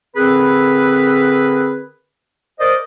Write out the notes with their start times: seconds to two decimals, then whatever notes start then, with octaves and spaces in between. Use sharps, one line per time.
0.16 D3 C4 G#4 A#4 B4
2.60 A#4 C5 D5 D#5